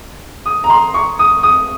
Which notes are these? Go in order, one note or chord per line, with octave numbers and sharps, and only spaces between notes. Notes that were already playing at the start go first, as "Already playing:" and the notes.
D#6
A#5
C6
C#6
D#6
D#6